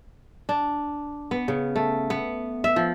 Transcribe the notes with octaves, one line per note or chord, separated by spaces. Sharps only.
D4
B3
C#3
A3
B3
E5
F3